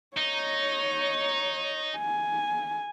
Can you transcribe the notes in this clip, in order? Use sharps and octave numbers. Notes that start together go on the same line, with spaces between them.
D#4 C#5
G#5